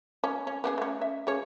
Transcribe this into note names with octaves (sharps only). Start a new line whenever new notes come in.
C#4
C#4
B3 G4 G#4
A3 C#4
E5
C#3 G#4 C#5